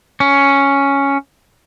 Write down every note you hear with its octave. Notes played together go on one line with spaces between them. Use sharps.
C#4